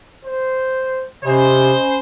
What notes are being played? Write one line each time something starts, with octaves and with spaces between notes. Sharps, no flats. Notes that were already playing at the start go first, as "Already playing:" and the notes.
C5
C3 C#4 C5 D#5 G#5 B5